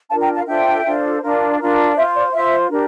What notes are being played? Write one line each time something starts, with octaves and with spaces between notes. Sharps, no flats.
D4 F4 A#4 F5 A5
G5 A#5
F5 A5
D4 F4 A4 C5 E5 G5
D4 F4 A4 C5
D4 F4 A#4
D4 F4 A#4
F4 C5 E5
D5
F4 C5 E5
D4 G4 A#4